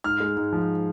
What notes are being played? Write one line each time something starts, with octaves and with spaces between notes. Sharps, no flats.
G#2 F6
G#3
G#2
F3